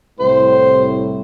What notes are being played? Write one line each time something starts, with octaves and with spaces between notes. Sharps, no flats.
C2 A2 C5